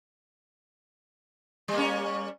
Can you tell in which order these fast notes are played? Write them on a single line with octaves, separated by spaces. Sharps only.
G3 A#3 C#4